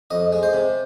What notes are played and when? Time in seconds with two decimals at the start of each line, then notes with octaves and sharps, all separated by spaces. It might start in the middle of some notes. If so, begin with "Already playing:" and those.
0.11 F2 D#5
0.32 G#3
0.43 C5
0.53 C3